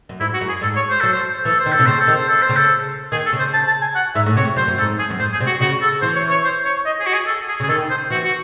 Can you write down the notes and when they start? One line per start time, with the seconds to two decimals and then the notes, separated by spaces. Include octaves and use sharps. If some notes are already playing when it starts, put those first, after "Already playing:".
0.09 F#2
0.20 G#2 E4
0.34 F#4
0.41 F#2
0.49 G#4
0.62 G#2 A4
0.76 C#5
0.90 C5
1.01 F#3 A4
1.13 C5
1.45 E3 A4
1.60 C5
1.66 D#3
1.72 A4
1.79 C3
1.87 C#3 C5
2.00 A4
2.07 D#3
2.15 C5
2.28 A4
2.42 C5
2.49 C#3
2.57 A4
3.12 D#3 G#4
3.26 A4
3.33 C#3
3.39 C5
3.53 A5
3.67 A5
3.81 G#5
3.95 F#5
4.15 G#2 E5
4.26 A2
4.37 C3 C#5
4.56 F#2 C5
4.68 F#2
4.78 G#2 A4
4.99 G#4
5.10 F#2
5.20 G#2 C5
5.33 G#4
5.40 C3
5.47 F#4
5.61 C#3 F#4
5.82 A4
6.02 E3 C5
6.16 C#5
6.31 C#5
6.44 C5
6.65 C#5
6.86 D#5
7.00 G#4
7.06 F#4
7.13 G#4
7.27 A4
7.48 G#4
7.60 C#3 G#4
7.69 D#3 A4
7.90 C5
8.10 E3 F#4
8.24 F#4